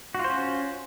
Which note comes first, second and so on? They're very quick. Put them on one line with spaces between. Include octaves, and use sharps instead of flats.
F#4 F4 C5 C#4